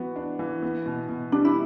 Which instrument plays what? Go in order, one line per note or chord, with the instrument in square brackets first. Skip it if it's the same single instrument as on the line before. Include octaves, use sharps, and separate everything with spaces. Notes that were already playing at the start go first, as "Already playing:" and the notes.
Already playing: [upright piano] E3 B3 F#4
D4
E3
B3
B2
B2
[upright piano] G3 [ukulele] D4
[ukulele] E4